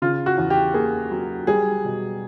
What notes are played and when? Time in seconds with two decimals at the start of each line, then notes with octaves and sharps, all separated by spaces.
0.02 C#3 F4
0.26 F#4
0.38 E2
0.50 G4
0.74 A#3 G#4
1.11 F#3
1.47 G3 G#4
1.85 B2